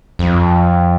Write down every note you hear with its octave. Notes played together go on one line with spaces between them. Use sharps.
F2